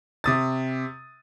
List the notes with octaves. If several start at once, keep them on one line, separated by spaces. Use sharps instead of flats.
C3 D#6 A6